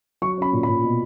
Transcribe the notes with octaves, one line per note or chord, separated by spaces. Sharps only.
F#3 C#6
C#4 B5
A#2
A#2 B5
B2